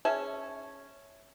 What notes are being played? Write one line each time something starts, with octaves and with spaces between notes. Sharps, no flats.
C#4 G#4 E5 A5